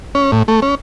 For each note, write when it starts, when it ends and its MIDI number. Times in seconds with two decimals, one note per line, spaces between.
0.15 0.31 61
0.32 0.43 45
0.48 0.60 57
0.62 0.75 61